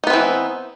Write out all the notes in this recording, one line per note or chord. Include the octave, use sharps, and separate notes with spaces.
E3 B3 C4 D#4